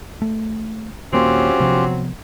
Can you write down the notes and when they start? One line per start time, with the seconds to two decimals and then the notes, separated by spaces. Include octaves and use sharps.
0.22 A3
1.13 D#1 D#2 F#3 A#3 C4 C#4 F4 G4
1.60 C3 F3 B3